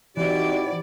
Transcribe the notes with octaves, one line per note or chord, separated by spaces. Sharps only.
E3 C4 D#4 E4 F#4 G4 D5